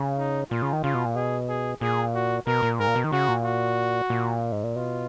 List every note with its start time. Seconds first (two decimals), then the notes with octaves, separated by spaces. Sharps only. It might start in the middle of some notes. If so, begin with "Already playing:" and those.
Already playing: C#3
0.18 D#4
0.50 A#2 F4
0.62 C#3
0.73 D#3
0.83 C#3 F4
0.94 B2
1.05 A#2
1.16 B2 G#4
1.49 G#4
1.81 A#2 G#4
2.15 F#4
2.47 B2 A#4
2.63 A#2
2.79 G#2 A#4
2.88 A#2
2.96 B2
3.04 D#3
3.12 C#3 F#4
3.28 A#2
3.45 F#4
4.10 A#2
4.52 G#2
4.64 A#2
4.75 B2 F4